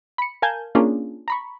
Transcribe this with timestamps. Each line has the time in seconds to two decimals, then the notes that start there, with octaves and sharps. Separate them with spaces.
0.18 B5 C#7
0.42 A#4 F5 G#5 A5 G6 G#6
0.75 A#3 C#4 D4 F4 G#4
1.28 A#5 B5 C#6